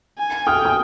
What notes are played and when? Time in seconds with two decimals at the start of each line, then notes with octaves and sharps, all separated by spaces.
0.18 G#5
0.46 G5 D#6 F6
0.65 D#6